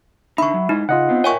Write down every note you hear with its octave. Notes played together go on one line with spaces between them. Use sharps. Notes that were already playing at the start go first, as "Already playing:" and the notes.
D3 D#4 E5 B5 C#6
F#3
G#3 D#4 E4 D#5
C#3 F4 D#5 F#5
B3 C4
A#4 C#5 E5 G5 G#5 C#6